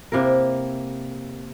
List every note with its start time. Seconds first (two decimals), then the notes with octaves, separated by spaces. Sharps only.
0.12 C3 A#3 E4 A#4